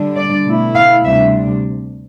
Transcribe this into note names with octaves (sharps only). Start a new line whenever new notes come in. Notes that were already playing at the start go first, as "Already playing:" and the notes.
Already playing: D3 G3 D4
D5
B2 A3 E4
F5
D2 C3 G3 D4 E5